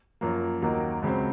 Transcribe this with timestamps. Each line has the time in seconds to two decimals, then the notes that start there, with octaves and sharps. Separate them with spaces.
0.21 F#2 F3 A#3
0.62 D#2 D#3 F#3 A#3 D#4
1.02 C#2 C#3 F#3 C4